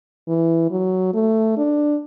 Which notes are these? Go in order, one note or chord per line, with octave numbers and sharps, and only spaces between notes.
E3
F#3
A3
D4